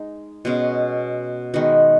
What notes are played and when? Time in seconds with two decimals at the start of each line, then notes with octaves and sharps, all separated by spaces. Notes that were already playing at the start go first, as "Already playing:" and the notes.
Already playing: G#3 D#4
0.45 B2 G#3 C#4
1.54 D#3 G#3 B3 F#4